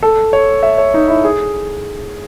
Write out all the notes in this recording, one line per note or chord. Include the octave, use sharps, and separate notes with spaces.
A4
C#5
E5
C#5
D#4
E4
G#4